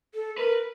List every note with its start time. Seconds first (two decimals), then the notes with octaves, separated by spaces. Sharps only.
0.14 A4
0.38 A#4 B4